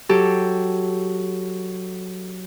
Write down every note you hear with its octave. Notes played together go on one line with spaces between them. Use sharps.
F#3 G4 A4